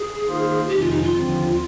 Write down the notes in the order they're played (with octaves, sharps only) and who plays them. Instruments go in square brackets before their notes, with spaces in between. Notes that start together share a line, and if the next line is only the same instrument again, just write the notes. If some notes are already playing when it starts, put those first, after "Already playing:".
Already playing: [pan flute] G#4
[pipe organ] D#3 A#3 F4 C5
[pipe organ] F2 C3 D#3 G#3 [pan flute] G4
[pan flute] F4
D#4
F4
[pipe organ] D#2 D3 F3 C4